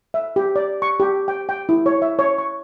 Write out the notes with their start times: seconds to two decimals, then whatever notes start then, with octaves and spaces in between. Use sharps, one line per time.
0.14 E5
0.36 G4
0.56 D5
0.82 C#6
1.00 G4
1.28 G5
1.49 G5
1.69 E4
1.86 C#5
2.02 E5
2.19 C#5
2.38 C#6